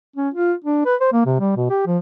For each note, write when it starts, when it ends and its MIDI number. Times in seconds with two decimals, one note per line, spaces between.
0.16 0.29 61
0.34 0.53 65
0.64 0.81 62
0.85 0.95 71
1.00 1.08 72
1.12 1.21 58
1.26 1.35 48
1.40 1.53 55
1.56 1.66 47
1.70 1.83 67
1.86 1.98 53